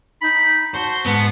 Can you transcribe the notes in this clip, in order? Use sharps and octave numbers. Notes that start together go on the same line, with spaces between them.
D#4 B5
F#4 C5 A5
G#2 B3 A5